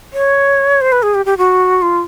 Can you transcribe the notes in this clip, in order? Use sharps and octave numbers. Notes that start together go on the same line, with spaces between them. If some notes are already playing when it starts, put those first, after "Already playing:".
C#5
C5
B4
G#4
G4
G4
F#4
F4